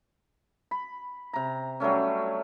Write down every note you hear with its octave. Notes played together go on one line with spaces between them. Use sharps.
B5
C3 A#5
F#3 G3 A3 C#4